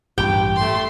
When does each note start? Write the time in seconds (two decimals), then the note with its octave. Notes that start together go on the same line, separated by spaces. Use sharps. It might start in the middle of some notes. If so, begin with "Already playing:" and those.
0.18 A1 G2 G4 G5
0.56 A3 C6